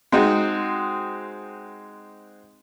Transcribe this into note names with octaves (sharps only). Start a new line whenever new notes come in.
G#3 C4 D#4 F#4